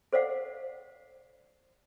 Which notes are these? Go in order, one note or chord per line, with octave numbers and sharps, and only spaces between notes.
A4 C5 D5 F5 F#5